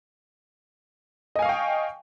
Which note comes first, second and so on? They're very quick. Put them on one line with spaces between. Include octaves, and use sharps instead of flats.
D#5 G#5 F5 C#6 G5